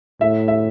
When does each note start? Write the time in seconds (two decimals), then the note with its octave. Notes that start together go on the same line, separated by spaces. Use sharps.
0.21 A2 E5
0.48 E5